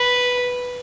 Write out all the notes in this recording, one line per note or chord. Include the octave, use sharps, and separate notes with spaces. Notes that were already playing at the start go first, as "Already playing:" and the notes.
Already playing: B4